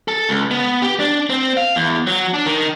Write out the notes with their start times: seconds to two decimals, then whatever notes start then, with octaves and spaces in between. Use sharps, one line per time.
0.08 A4
0.29 C#2
0.51 B3
0.82 G4
1.00 D4
1.30 C4
1.57 F5
1.76 E2
2.07 F#3
2.34 D4
2.46 D#3